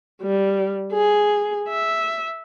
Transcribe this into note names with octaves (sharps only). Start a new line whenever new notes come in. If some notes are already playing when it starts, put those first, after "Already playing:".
G3
G#4
E5